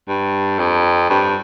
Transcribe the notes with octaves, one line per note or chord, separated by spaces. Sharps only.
G2
F2
G2